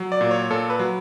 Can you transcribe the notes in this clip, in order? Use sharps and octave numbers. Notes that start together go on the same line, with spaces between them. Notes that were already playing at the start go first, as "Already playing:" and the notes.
Already playing: F#3
D5
A#2
C#5
A#2 A4
B4
F#3